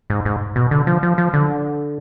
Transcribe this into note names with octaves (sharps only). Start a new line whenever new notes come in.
G#2
G#2
B2
D3
F3
F3
F3
D3